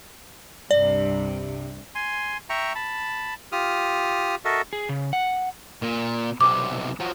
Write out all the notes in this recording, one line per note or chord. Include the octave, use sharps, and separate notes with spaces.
C2 G2 C3 D5
G#5 C6
E5 G5 A#5 C#6
A5 B5
F4 G4 D#6 F6
F#4 A4 A#4 D#5 E5
G#4
C#3
F#5
A#2
B1 C3 D6
F3 F#3